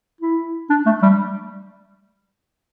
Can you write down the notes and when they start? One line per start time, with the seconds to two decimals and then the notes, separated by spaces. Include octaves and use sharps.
0.21 E4
0.69 D4
0.86 A3
1.02 G3